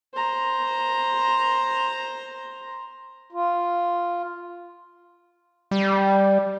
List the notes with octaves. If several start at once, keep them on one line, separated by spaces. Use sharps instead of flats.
C5 A#5
F4
G3